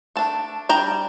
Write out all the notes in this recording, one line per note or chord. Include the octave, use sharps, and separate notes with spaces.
A3 D4 A5
G3 D4 G5 A#5